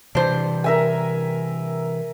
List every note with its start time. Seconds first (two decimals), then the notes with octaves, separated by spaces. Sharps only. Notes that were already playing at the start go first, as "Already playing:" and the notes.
0.15 C3 E3 D4 C5
0.64 A#4 E5 G#5